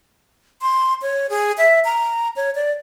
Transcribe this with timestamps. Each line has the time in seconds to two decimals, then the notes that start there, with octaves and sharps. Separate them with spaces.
0.62 C6
1.02 C#5
1.30 G#4
1.58 E5
1.85 A#5
2.36 C#5
2.55 D5